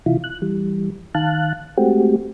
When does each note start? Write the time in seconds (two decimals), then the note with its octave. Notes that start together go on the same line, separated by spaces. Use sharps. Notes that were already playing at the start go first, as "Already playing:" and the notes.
0.06 C3 E3 E4 F4
0.24 F#6
0.42 E3 G3
1.15 D#3 F5 A5 F#6
1.77 G#3 A3 C4 F#4 G4